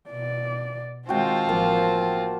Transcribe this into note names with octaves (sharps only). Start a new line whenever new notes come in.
B2 D5
D#3 G#3 C4 F4 F#4 G5 A5
A1 F3 A#3